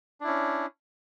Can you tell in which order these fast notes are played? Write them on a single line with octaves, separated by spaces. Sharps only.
D4 E4 C#4